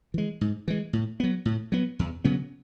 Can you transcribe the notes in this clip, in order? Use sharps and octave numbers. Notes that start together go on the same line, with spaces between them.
E3 G#3
G#2
E3 G#3
A2
F#3 B3
A2
F#3 B3
E2
C#3 F#3 B3